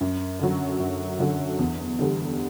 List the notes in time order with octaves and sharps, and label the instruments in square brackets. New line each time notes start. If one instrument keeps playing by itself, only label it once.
[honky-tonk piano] F#2
D3 F#3
F#2
D3 F#3
E2
D3 G3